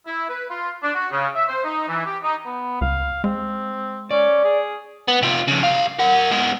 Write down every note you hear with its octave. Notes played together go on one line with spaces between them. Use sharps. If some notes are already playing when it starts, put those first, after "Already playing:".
E4
B4
F4
D4
F#4
C#3
E5
C5
D#4
E3
G4
D#4
B3
C#2 F5
G#3 C4
C#4 D5
G#4
B3
C3 F4
F2 C#3
C2 F5
A#4 F#5
G#3 B3